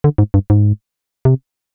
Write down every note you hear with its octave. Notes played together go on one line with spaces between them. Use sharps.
D3
G#2
G2
G#2
C3